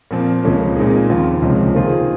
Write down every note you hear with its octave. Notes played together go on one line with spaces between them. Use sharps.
A#2 F3 C4
C#2 C#3 F3 A#3 C#4
A#2 G#3 C4 D#4 G#4
D#2 C#3 F3 C4 F4
C#2 C3 F3 G#3 C#4
D#3 A#3 F4 G#4 C5